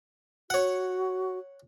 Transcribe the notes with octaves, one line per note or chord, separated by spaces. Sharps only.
F#4 C#5 F#5